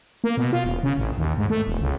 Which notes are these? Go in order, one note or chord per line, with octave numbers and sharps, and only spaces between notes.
A#3
B2
F4
E1
C#3
A1
D#2
G#2
A3
E1
C#2